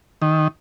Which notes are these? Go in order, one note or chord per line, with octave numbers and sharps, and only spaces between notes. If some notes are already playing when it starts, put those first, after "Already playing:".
D#3